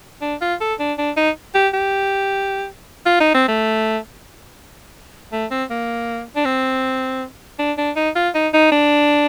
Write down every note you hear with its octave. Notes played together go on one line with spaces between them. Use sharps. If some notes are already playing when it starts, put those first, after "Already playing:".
D4
F4
A4
D4
D4
D#4
G4
G4
F4
D#4
C4
A3
A3
C4
A#3
D4
C4
D4
D4
D#4
F4
D#4
D#4
D4